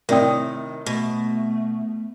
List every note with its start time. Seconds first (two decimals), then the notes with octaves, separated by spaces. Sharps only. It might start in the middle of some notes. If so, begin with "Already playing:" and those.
0.09 A2 C3 D#3 A#4 D5 G5 D#6
0.86 B2 A3